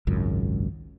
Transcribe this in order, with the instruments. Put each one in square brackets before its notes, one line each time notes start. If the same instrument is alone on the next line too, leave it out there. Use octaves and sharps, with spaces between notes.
[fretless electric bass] G#1 C#2 F#2